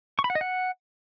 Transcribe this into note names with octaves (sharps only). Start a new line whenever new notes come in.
C#6
B5
F#5
D#5
F#5